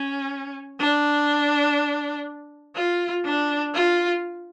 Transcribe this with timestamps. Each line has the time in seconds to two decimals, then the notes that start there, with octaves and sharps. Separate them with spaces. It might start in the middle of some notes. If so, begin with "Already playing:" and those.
Already playing: C#4
0.80 D4
2.76 F4
3.25 D4
3.74 F4